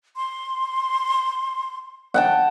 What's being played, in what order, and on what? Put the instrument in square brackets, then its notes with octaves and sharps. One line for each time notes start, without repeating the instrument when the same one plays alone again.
[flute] C6
[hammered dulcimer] F#5 G5 A5